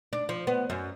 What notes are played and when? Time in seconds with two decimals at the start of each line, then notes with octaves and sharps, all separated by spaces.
0.13 D4
0.29 F3
0.47 B3
0.70 F#2